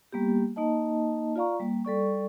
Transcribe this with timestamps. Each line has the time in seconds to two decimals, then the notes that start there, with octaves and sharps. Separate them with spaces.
0.12 G3 A#3 B3 G4
0.56 A#3 D#4 D#5 A5
1.36 F4 D5 F5 A#5 C#6
1.60 G3 A#3
1.85 G3 A4 D5 C#6